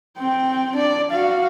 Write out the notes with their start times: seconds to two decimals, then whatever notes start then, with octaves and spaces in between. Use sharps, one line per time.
0.18 C4 G5
0.75 D4 D5
1.11 F#4 F5